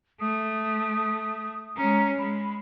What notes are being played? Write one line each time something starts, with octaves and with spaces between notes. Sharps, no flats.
A3 D#6
G#3 C#4 A#5
G#3 B5